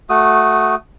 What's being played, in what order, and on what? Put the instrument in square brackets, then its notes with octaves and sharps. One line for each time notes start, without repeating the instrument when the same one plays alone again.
[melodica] A3 F#4 D#6